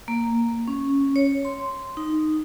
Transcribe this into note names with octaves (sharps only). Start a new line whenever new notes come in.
A#3
C#4
C#5
C6
D#4